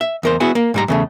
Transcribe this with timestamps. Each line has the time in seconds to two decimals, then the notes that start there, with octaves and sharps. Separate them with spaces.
0.01 E5
0.23 E2 A#4 C5
0.40 B3 E4 F#4 G#4
0.55 A#3
0.74 G#2 G3 A#5
0.88 E2 C#3 A3